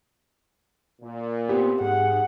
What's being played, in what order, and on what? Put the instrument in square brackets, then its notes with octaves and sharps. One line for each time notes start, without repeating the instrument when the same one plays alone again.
[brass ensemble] A#2
[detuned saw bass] B3 [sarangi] C4 [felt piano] G4
[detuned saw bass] G#2 [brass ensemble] G#4 [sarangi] F#5